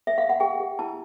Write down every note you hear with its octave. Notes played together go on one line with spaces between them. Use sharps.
E5
F5
F#5
G4 G5
G4
E4 A5